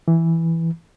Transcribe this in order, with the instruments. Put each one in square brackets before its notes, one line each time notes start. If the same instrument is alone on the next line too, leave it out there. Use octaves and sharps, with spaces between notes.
[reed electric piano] E3